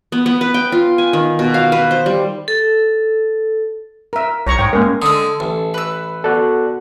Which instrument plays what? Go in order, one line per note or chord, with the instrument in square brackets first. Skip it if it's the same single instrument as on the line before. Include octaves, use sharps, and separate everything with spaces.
[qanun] B3
B3
B4
G5
F4
G#5
D#3
B2
F5
B4
C5
G3
[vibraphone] A4
[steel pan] A#4 E5
[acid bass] C2 [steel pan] C#5 A#5 C#6
[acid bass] G#2 [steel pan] C#5 G5
[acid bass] G#3 [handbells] A#3 C#4 A#4
[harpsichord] D3 G#3 [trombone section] A4 [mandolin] D#6 E6
[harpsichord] A1
[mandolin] B4 E6
[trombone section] B3 F#4 [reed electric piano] A4 D5 F#6